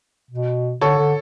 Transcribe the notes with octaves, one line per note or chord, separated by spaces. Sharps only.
B2
D3 A4 C#5
D3